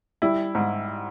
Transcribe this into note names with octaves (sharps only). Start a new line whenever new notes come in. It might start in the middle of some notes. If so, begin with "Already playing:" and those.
G3 E4
G#2